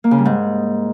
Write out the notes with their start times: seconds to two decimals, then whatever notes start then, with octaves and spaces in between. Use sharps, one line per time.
0.04 A#3
0.11 C#3
0.18 G3
0.25 G#2